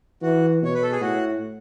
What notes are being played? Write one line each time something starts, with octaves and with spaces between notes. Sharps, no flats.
E3 F#4
B2 C#5
B4
A4
G#4
A2 F#4